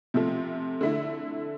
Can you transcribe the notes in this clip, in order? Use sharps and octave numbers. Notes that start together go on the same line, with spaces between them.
C3 F3 A3
D3 A3 E4